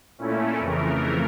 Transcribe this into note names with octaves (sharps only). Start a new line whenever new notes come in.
A#2 A3 C#4 E4
F2 C#3 E3 A3 A#4